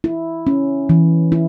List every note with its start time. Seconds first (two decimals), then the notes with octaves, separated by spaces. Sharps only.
0.04 E4
0.47 C#4
0.89 E3
1.32 E4